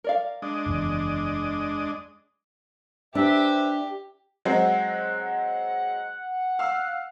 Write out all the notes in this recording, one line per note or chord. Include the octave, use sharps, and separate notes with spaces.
A#4 D5 F5
G#3 D4 D#5
F#1 E2
D4 G4 B4 C5 E5
F#3 G#3 C4 F#5
F5 E6